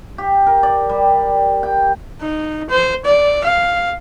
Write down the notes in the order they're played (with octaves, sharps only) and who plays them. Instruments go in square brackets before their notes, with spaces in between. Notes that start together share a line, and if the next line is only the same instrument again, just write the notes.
[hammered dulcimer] G4
A#4
D5
G3
G5
[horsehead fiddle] D#4
C5
D5
F5